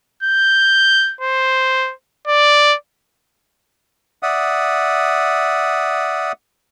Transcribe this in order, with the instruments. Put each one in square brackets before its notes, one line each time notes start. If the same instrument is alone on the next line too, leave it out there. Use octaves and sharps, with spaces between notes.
[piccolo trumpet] G6
C5
D5
[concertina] D5 E5 F#5 D#6